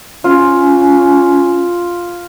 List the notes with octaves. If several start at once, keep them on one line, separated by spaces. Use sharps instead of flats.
C#4 F4